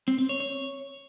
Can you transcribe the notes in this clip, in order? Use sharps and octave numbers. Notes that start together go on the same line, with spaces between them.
C4
C4
C#5
C#5